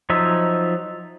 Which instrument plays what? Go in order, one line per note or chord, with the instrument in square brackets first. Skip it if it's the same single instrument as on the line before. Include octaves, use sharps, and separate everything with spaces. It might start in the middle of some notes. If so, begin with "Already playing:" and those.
[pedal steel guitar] F3 F#3 D#4 E5